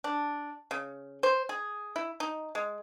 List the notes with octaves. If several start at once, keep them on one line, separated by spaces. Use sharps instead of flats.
D4
C#3
C5
G#4
E4
D#4
G#3